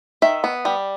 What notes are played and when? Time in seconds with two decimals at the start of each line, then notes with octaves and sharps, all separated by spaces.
0.22 D#3 E5
0.44 B3
0.65 G3